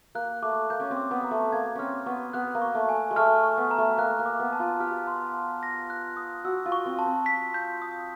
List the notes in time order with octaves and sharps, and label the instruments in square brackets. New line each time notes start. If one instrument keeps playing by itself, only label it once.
[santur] A#3 [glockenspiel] F#6
[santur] A3 [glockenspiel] D6
[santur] A#3 [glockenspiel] G6
[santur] C#4
C4
[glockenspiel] D6
[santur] B3
[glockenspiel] A#5
[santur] A3
[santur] A#3 [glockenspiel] G#6
[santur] C4 C#4 [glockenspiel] F6
[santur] B3 [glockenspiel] C#6
[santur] B3 [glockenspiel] F#6
[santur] A#3
[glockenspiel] C#6
[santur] A3
[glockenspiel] G#5
[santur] G#3
[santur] A3 [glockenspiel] F6
[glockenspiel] C#6
[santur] B3
[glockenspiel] A#5
[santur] A3
[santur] A#3 [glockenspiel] F#6
[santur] A#3
[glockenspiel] D6
[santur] B3
[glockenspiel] A5
[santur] F4
[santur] G4 [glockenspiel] F6
[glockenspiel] C6
A5
A#6
F#6
D#6
[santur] F#4 [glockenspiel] E6
[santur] F4
[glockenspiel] C#6
[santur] C4
[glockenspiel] A5
[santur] C4
[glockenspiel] B6
G6
D#6